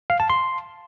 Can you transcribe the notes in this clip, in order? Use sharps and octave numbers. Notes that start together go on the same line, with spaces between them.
F5
A5
C6